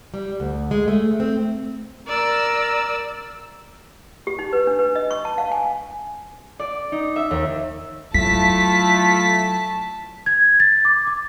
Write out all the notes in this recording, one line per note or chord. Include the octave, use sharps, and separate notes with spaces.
G3
D2
G#3
A3
C4
A#4 D5 E6
G4
D#4
B4
D4
B4
D#5
C#6
A5
F5
G#5
D5
D#4
E5
D#2
F#3 A3 E4 F4 A5 B6
G#6
A6
D6
D6